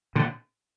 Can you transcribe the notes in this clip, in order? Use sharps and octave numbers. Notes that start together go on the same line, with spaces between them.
A#2 D3